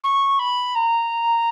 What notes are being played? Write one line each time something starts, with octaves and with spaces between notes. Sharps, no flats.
C#6
B5
A#5